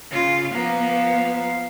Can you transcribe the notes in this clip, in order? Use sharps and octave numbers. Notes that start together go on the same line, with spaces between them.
C#3 F4
F3 B3 F5 A#5